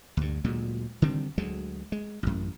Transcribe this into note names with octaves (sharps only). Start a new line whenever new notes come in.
D2 G2
D2 A#2 F#3 G#3
D3 D#3 G3 C4
D2 F#3 G#3
G#3
A1 F#2